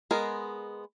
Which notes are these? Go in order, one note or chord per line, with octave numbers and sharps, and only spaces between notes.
G#3 B3 G#4 A#4